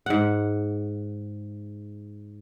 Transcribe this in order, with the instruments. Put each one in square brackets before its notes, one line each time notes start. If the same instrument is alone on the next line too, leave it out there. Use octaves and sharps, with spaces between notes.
[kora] G#2 F#5